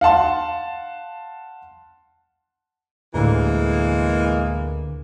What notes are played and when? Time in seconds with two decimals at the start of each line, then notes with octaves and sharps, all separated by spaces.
0.01 F5 F#5 A5 C6
3.14 D2 A2 D3 E3 G#3 A#3